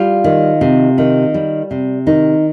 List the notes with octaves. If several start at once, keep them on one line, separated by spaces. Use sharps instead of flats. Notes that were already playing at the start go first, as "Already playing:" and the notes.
Already playing: G3 F4
D#3
C3
D#3
G3
C3
D#3 D#4